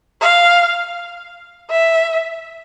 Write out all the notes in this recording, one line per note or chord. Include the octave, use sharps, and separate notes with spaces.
F5
E5